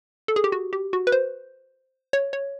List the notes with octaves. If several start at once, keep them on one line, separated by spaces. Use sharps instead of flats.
A4
G#4
G4
F#4
G4
F#4
B4
C5
C#5
C#5